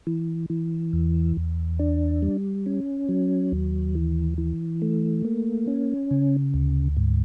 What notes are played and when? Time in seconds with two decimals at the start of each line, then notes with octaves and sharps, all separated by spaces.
0.07 E3
0.50 E3
0.93 E2
1.37 E2
1.79 D4
2.22 G3
2.66 C#4
3.09 F#3
3.52 D#2
3.95 E3
4.38 E3
4.82 A3
5.25 A#3
5.67 C#4
6.11 C#3
6.54 D2
6.97 G#2